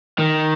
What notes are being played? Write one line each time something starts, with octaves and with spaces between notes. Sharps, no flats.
D#3